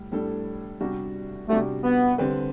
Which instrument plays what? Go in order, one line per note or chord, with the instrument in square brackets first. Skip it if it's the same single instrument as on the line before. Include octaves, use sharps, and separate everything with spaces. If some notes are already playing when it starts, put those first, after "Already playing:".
Already playing: [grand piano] A2 G3
A2 G3 D4 A4
C3 G3 D4 F#4
[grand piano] C3 G3 D4 F#4 [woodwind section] A3
[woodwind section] B3
[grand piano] D3 G3 C4 G4 B4